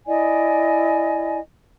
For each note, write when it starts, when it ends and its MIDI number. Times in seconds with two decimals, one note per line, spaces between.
0.07 1.40 64
0.07 1.40 74
0.07 1.40 75
0.07 1.40 80